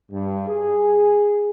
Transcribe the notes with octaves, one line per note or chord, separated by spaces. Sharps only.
G2
G#4